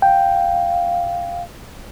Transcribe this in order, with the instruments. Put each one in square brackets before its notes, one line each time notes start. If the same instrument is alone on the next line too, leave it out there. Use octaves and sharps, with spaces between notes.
[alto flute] F5 [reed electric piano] G5